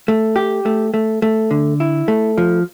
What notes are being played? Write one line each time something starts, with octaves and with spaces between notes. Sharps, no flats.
A3
G4
A3
A3
A3
D3
E4
A3
F3